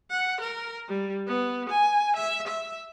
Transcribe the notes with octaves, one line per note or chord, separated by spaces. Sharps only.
F#5
A#4
G3
B3
G#5
E5
E5